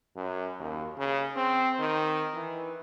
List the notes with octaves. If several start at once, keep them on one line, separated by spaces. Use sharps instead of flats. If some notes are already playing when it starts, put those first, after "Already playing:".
F#2
D#2
C#3
C4
D#3
E3